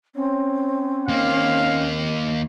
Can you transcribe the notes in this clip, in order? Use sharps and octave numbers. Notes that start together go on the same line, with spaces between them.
C4 C#4
D#2 A#3 F5